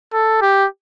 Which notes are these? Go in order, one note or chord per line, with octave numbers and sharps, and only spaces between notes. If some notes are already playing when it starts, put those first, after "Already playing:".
A4
G4